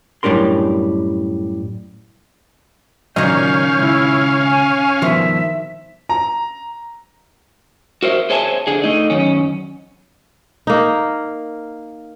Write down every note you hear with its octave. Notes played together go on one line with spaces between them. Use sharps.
F#2 A2 G3 D4 A#4 C6
C#2 A#2 D#3 F#3 C#4 D#5 F5 G6
C#2 E4
G#5
G2 B2 D#3 F3 E5
A#5
F#4 A#4 C5 E5
G#4 C5 C#5 E5 G#5 A5
D3 G#4
A3 D#4
F#2 D#3 C#4
A#3 D#4